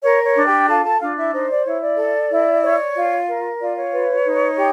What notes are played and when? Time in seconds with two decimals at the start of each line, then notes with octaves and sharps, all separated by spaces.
0.02 A#4 C#5
0.25 C#5
0.35 D4
0.46 G4 G5
0.68 F4 A4 A5
0.85 A4 A5
1.00 D4 F4 F5
1.16 E4 E5
1.32 D#4 C5 D#5
1.49 D5
1.65 E4 C#5
1.81 D5
1.97 A4
2.30 E4
2.63 C#5
2.95 F4
3.27 A#4
3.59 F4 D5
3.76 C#5
3.92 B4
4.25 D#4
4.57 G4